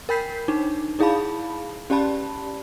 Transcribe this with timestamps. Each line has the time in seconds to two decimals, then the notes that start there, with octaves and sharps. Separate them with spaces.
0.09 A#4 G5 B5 G6 B6 C7
0.48 D4 D#4
0.99 D#4 E4 G#4 F5 A5 B5
1.90 C#4 G4 D5 A5 B5